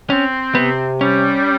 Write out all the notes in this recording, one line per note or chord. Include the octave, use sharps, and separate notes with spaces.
C4 C#4
C3 B3
G3 C#4